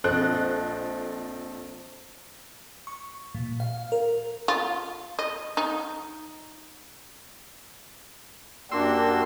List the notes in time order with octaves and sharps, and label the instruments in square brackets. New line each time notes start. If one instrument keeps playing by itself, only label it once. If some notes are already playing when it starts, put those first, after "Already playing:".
[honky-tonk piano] A#1 C4 A4 D#5 F#6
[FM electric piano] C#6
A#2
F5
A#4
[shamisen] F4
D#5
D#4
[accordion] F#2 A#3 F#4 [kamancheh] D4 G4 [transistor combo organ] C6 E6